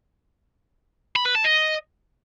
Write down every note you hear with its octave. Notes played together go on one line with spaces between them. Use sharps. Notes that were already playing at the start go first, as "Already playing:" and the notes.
B5
B4
A5
D#5